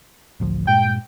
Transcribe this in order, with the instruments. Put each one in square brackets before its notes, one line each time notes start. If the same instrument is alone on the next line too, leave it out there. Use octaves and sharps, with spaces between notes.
[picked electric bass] A1 D2 F3
[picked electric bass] G2 A#2 G#3 [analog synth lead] G5